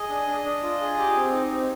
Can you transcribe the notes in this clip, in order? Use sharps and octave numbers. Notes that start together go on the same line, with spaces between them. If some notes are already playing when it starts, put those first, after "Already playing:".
Already playing: G#4 D#5
D4
D4
D4
F4
G#4
G4
C4
D#4
C4